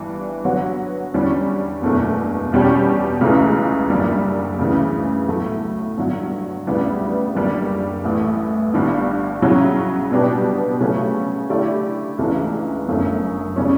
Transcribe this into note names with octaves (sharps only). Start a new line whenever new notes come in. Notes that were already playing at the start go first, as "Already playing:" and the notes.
Already playing: G1 G2 E3 G3 D4
D3 F#3 B3 F#4 C#5
E2 D3 G3 C#4
F#1 E2 B2 A3 D4
E2 B2 G3 C#4 G4
C#2 C#3 E3 A3
F#1 F#2 D3 G3
D2 C#3 E3
B1 A2 F#3 A3
G2 D3 F#3
D2 C#3 G3 B3 E4
F#1 F#2 D3 G3
A1 A2 E3
G1 G2 D3 G3
C#3 F#3 C#4 E4
B2 G3 B3 D4 G4
C#3 F#3 A3 C#4
D3 A3 E4 G4 D5
C#2 C#3 E3 A3 D4
G1 F#2 D3 A3 C#4
C#3 G3 C#4